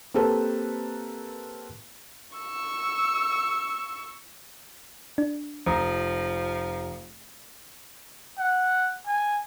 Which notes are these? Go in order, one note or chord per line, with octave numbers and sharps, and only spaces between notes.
A#3 C4 G4 A4 B4 C5
C#6 E6
D4
F1 F3 A#5 D#6
F#5
G#5